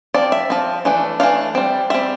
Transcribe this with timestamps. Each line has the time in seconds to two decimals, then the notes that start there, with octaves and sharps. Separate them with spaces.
0.14 F3 C4 D5
0.32 E5
0.50 F3 C4
0.85 E3 A3 D4
1.20 E3 A3 D4 F5
1.55 G3 C4
1.90 G3 C4 E5